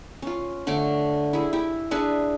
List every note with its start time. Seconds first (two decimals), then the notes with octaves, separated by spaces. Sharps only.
0.22 C#4 F4
0.67 D3 A3 C#5 D6
1.33 E4 G#4
1.53 E4 G4
1.91 D4 G#4 B4 E5